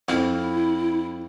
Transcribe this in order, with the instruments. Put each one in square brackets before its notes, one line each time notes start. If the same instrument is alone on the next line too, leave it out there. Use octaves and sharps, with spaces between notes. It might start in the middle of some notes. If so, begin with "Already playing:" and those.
[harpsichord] F2 [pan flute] E4